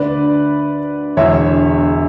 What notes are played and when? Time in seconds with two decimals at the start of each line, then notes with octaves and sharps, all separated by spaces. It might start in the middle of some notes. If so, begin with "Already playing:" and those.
Already playing: D2 D3 B4 D5
1.17 E1 E2 D3 C#5 E5